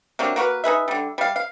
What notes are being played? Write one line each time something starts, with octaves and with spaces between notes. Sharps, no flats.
C3 F#3 A#3 D4
A#3 F#4 A#4 B4
D#4 G#4 B4 E5
D3 G3
G3 F5
F5